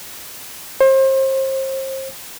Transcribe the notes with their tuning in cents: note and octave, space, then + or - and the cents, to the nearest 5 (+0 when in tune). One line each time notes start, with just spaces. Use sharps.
C5 +35